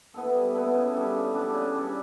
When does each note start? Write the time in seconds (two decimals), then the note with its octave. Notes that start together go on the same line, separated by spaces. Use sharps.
0.14 B3 E4 A4
0.35 G3
0.54 B3 E4 A4
0.74 C#3
0.94 G3 D4 A4
1.14 C#3
1.34 G3 D4 A4
1.54 C#3
1.75 G3 D4 A4